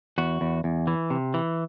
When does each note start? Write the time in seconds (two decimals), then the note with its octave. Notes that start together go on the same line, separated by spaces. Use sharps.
0.18 E2 F#4
0.41 E2
0.64 E2
0.87 E3
1.10 C3
1.34 E3